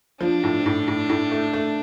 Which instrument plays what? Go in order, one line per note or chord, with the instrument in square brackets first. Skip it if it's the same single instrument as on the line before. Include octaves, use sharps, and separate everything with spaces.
[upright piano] F3 [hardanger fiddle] D4
[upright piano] A2
A2
A2
A2
A3
A3